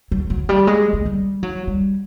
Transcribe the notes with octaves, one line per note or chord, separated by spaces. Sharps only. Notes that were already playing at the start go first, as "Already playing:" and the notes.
F#3
F#3
G3
G#3
G#3
G3
F#3
G3